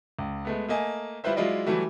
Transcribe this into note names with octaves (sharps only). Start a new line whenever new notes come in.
C#2
G#3 A3 B3
A3 A#3 D#5 G#5
G3 E4 F4 B4 C5 E5
F#3 G#3 E4 F4 D5 D#5
E3 F#3 G3 A3 F#4